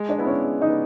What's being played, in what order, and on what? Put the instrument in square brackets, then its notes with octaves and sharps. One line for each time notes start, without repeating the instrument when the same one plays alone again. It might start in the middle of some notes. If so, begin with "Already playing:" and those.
Already playing: [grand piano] G#3
[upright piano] D4 D5
[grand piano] B3 E4
[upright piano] C#4 C#5
[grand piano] G#3
[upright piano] D#4 D#5
[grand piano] B3